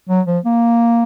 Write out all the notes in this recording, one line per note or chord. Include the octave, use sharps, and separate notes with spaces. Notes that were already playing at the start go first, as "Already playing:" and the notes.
F#3
F3
A#3